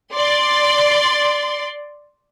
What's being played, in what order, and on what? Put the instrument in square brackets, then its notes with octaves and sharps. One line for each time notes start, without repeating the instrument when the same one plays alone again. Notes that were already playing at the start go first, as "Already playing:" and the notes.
[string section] D5 C6